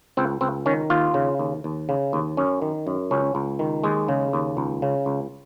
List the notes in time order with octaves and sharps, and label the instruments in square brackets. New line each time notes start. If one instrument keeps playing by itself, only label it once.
[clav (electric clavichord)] C#2 C4
C#2 C4
D#3 C#4
D#2 F4
C#3
D#2
D#2
C#3
D#2
F#2 C#4
D#3
F#2
C#2 C#4
C#2
D#3
D#2 G#3
C#3
D#2
C#2
C#3
C#2